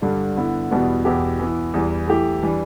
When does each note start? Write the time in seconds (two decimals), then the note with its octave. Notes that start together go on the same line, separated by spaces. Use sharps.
0.02 G2 D3 G3 D4
0.36 D3 B3 E4
0.71 E2 B2 G3 B3 E4
1.05 E2 B2 B3 E4 G4
1.39 E3 B3 E4
1.73 E2 E3 G3
2.08 E3 A3 E4 G4
2.43 E3 G3 D4